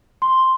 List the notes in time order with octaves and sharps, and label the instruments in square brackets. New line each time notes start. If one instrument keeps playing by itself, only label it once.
[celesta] C6